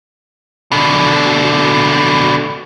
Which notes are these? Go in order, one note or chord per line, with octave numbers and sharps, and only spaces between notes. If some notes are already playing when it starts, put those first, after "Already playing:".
B2 D3